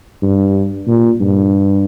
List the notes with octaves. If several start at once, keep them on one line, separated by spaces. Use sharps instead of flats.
G2
A#2
G2